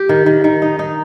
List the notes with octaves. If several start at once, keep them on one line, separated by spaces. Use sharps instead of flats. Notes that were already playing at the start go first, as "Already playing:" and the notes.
Already playing: G4
D#3
D#3
D#3
D#4
D#4